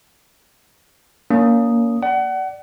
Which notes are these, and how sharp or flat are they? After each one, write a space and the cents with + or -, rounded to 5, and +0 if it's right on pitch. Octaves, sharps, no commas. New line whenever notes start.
A#3 +0 C#4 +40 D#6 +0
D5 +0 F#5 +30